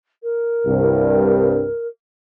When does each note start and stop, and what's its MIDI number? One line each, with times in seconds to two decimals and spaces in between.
0.23 1.87 70
0.66 1.66 36
0.66 1.66 43